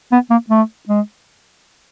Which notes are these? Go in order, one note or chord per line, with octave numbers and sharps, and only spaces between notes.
B3
A#3
A3
G#3